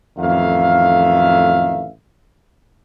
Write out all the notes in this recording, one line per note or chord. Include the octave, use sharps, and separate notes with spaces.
A1 F2 D#3 E5 F5